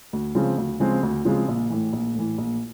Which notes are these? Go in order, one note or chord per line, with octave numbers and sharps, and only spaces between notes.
D2
C#3 F3 G#3 C4
D2
C#3 F3 G#3 C4
D2
C#3 F3 G#3 C4
A#1
A2 E3
A#1
A2 E3
A#1